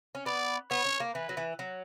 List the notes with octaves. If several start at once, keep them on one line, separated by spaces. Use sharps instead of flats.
C#4
B3 D5
B3 C#5
C#4
A#3
E3 B4
F#3
E3
F#3